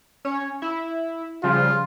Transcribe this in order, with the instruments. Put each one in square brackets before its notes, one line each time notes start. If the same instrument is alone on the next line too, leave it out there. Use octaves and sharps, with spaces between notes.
[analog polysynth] C#4 C#5
E4 E5
[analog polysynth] C#3 F3 G3 [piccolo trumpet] F4